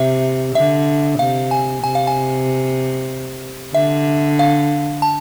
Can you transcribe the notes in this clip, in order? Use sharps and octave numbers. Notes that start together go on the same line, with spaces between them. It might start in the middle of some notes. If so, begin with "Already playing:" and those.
Already playing: C3 E5
D3 E5
C3 F5
G#5
C3 G#5
F5
G#5
D3 E5
F5
A5